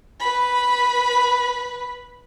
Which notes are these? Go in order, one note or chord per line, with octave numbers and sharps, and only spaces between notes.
B4 B5